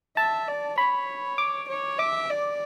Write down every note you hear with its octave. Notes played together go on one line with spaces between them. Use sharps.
E5 A5
D5
C#5 B5
D6
C#5
E5 D6
D5